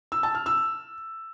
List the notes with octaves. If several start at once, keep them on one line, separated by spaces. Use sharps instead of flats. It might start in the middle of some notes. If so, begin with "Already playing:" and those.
E6
A5
F6
E6